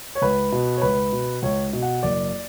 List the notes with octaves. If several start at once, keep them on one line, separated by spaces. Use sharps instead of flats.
C#5
C#2 B4
B2
C#5
C#2 B4
B2
C#2 C#5
B2
F#5
F#1 D5